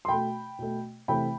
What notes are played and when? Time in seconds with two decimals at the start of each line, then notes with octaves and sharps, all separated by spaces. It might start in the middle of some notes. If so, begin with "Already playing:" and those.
0.05 C6
0.08 B2 A3 G5 B5
0.59 B2 A3
1.08 C3 E3 A3 G5 B5